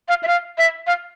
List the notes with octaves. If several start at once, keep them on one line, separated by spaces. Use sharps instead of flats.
F5
E5
F5
E5
F5